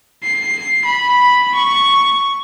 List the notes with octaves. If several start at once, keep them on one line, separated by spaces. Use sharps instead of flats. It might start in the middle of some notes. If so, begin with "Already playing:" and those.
C7
B5
C#6